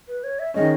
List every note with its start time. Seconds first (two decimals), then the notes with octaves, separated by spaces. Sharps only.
0.08 B4
0.24 C#5
0.39 E5
0.54 D#3 G#3 C#4 D#5